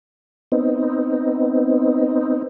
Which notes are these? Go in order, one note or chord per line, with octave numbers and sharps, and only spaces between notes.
B3 C4 D#4